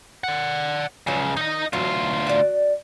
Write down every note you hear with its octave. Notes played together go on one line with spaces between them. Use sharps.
D5 F#5
C#2 C#3 F3 F#3
D#3 D#4 D#5
D2 F#3 F4 F#4
F#4 D5